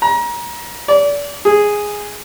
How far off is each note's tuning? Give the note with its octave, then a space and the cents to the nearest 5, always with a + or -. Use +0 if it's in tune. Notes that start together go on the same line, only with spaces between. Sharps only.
A#5 +30
D5 -30
G#4 -5